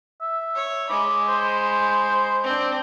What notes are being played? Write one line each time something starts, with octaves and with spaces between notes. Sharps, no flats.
E5
C#5
G#3 B5 D6
C5
C4 D4